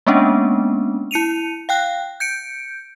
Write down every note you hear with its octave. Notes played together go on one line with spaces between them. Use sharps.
G#3 A#3 B3 C#4 D4
E4 C#7 D#7 F7
F5 G5 F#6
G6 C#7 D7